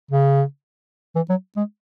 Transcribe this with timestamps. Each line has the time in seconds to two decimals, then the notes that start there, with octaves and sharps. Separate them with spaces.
0.11 C#3
1.15 E3
1.29 F#3
1.57 G#3